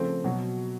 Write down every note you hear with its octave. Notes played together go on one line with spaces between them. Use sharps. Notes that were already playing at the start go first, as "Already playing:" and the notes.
Already playing: C#3 F3 A3 C4
B2 F#3